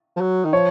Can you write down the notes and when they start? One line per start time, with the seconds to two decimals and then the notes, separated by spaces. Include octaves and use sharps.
0.16 F3
0.21 F#3
0.45 D#3
0.53 F3 C#5